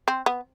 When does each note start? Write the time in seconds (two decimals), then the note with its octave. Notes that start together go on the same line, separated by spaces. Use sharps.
0.08 C4
0.26 B3